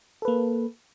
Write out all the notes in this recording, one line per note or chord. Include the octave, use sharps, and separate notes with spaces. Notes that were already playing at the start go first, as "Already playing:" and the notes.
A#3 A4 B4